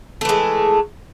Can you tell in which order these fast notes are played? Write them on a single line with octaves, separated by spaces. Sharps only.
A3 E3 G#3